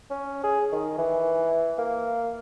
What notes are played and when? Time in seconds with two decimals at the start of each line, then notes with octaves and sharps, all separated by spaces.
0.11 C#4
0.44 G#4
0.72 D#3
0.98 E3
1.78 A#3